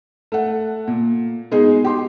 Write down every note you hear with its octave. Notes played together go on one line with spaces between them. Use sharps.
A3 F#5
A#2
B2 G#3 D#4 G#4
G4 C6